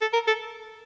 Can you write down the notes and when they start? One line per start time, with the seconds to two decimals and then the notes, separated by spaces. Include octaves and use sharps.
0.02 A4
0.13 A#4
0.27 A4